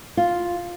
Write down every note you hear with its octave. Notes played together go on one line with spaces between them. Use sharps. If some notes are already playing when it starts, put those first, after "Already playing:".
F4